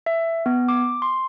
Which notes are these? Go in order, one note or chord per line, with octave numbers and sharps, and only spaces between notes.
E5
B3
D6
C6